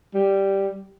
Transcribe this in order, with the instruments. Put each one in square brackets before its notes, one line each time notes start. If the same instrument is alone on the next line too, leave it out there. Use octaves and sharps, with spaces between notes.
[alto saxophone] G3